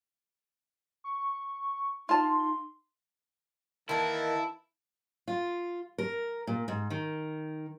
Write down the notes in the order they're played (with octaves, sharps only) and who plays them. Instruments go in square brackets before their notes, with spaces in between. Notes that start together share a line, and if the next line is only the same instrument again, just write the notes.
[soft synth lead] C#6
[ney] D#4 [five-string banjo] F4 A5 [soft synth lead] C6
[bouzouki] D#3 A#3 [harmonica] E3 A4 A5 [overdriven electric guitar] E4 [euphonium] A#4
[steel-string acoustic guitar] F4
A#4
A#2
G#2
D#3